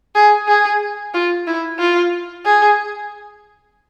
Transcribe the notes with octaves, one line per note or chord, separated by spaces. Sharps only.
G#4
G#4
F4
E4
F4
G#4